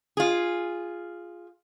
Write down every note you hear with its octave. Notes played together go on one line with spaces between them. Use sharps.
F4 G#4